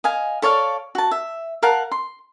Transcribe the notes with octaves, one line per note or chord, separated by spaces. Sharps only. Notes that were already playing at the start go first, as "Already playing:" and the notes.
D#5 F5 G#5
A4 C#5 D5 F5
F#4 A5
E5
A#4 F5 F#5 A5
C6